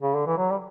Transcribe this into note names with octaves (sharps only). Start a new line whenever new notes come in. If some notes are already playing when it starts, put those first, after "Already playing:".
C#3
D3
E3
F#3
G3